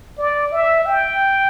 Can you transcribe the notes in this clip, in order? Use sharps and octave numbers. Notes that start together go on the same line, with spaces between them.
D5
E5
G5